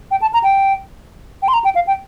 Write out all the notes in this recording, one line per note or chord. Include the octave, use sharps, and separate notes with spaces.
G5
A5
A#5
G5
G5
C6
A#5
G5
F5
G5